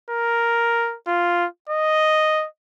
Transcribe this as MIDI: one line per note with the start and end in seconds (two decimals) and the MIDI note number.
0.10 0.96 70
1.07 1.46 65
1.69 2.46 75